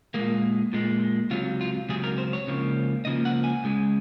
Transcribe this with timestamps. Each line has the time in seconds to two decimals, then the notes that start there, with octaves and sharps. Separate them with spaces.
0.14 A#2 G#3 A#3
0.73 A#2 G#3
1.30 C#2 C3 F#3 F4
1.61 F4
1.89 C#2 C3 F#3 G#4
2.04 A#4
2.18 C5
2.33 C#5
2.47 C#2 C#3 F3 A#3
3.05 C#2 C#3 F3 A#3 D#5
3.25 F#5
3.44 G#5
3.64 C#2 C#3 G#3